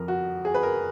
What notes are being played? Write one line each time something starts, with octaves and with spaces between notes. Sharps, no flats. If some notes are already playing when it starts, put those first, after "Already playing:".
Already playing: F2 F3 A#4
F#4
G#4
B4
A#4